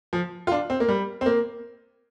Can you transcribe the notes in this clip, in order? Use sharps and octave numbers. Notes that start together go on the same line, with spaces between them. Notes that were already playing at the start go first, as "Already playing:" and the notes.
F3
F4
D4
C4
A#3
G3
C4
A#3